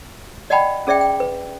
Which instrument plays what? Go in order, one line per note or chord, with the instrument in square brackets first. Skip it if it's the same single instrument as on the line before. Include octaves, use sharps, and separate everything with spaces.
[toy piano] D5 D#5 F#5 G5 A5 B5
C#4 G#4 D5 E5 G5
G5
B4